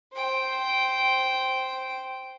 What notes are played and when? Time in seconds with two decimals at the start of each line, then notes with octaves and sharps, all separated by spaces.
0.14 C5 G5